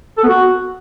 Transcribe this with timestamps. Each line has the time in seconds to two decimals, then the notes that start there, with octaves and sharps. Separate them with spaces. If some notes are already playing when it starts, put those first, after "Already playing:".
0.18 A4
0.24 B3
0.29 F#4